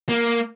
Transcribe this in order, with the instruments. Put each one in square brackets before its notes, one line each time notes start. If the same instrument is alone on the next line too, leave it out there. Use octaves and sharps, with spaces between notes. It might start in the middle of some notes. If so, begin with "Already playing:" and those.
[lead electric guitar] A#3